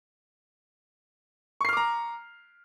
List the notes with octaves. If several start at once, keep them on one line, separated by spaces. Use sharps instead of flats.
A#5 C#6 D6 F6 C7